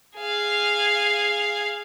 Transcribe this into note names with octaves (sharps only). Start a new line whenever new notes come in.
G#4 F5